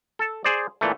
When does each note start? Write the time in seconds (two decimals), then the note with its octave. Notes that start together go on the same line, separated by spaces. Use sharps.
0.19 A4 A5
0.45 G#4 C5 D5
0.81 A#2 E3 A3